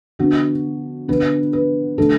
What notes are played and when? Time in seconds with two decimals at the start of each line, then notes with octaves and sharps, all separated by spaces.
0.19 D3 B3 D4 F#4
1.08 D3 B3 D4 B4
1.53 B4
1.98 D3 A3 D4 A4